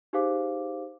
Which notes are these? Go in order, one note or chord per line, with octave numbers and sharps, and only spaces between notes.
D#4 G4 G#4 C5 F5 D6